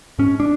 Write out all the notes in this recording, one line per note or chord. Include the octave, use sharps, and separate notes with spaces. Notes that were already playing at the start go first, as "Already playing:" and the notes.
G#2 C#4
D4